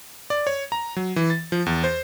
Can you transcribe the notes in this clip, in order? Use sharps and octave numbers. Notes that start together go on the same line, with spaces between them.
D5
C#5
A#5
F#3
E3
A6
F3
E2
C5